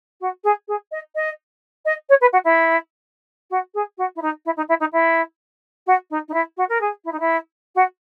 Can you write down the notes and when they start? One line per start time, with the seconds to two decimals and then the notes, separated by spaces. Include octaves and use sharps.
0.20 F#4
0.43 G#4
0.67 G#4
0.91 D#5
1.15 D#5
1.85 D#5
2.09 C#5
2.21 B4
2.32 F#4
2.44 E4
3.50 F#4
3.74 G#4
3.97 F#4
4.15 E4
4.21 D#4
4.45 E4
4.56 D#4
4.68 E4
4.79 D#4
4.92 E4
5.86 F#4
6.10 D#4
6.28 D#4
6.33 E4
6.57 F#4
6.69 A#4
6.80 G#4
7.04 E4
7.12 D#4
7.19 E4
7.75 F#4